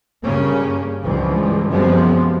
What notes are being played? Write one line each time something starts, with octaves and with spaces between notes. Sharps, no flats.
G2 C#3 A#3 C#4
C#2 G2 E3 F3
F#2 C3 F3 G3 G#3 B3